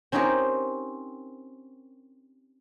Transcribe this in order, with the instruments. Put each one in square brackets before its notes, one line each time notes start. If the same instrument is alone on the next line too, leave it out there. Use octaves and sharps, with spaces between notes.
[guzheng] C4 C#4 D#4 F4 G4 A#4